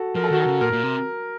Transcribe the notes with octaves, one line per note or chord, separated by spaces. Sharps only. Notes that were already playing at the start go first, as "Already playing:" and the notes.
Already playing: F#4 A4
F3 A#4
A4
D#3 F#4
A4
C#3
A#2 A#4
A#2
C3